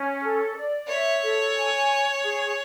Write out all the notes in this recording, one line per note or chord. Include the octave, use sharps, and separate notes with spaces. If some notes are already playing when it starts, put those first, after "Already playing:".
Already playing: C#4
A4
D5
C#5 E5
A4
G#5
C#6
G#4